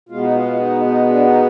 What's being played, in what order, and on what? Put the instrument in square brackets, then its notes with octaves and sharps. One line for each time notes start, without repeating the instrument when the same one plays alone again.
[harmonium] B2 G#3 B3 F4
D#4
F4
D#4
D#4
D4
D#4